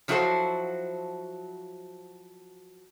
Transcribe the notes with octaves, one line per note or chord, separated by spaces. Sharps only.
F3 F#3 E4 F#4 A4 C5